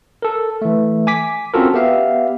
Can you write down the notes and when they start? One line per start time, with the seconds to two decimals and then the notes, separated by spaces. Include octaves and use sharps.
0.22 A4 A#4
0.62 E3 A3
1.07 G#5 D6 B6
1.54 C4 C#4 F4 F#4 A4 A#4
1.74 B3 G4 E5 F5